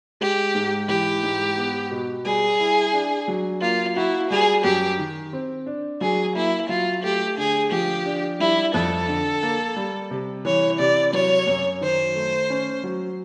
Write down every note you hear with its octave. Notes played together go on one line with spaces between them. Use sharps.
G#3 G4
G#2
E3 G4
G#2
B3
B2
G3 G#4
E4
D4
F#3
A#3 F4
E4 F#4
G3 G#4
F#2 G4
D#3
C4
D4
F#3 G#4
A#3 E4
F#3 F4
A3 G4
D3 G#4
F3 G4
D4
G3 E4
F2 A4
D3
A#3
G3
C3
E3 C#5
C3 D5
F#3 C#5
F#2
D#3 C5
A3
C#4
F#3